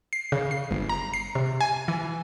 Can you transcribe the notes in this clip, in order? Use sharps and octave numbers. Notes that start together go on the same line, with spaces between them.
C7
C#3
C7
G1
A#5
C7
C3
G#5
E3